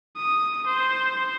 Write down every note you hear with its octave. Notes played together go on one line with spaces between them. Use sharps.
D#6
C5